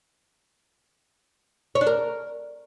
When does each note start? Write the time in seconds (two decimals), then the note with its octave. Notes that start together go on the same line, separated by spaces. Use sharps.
1.75 C#5
1.81 D4
1.87 A#4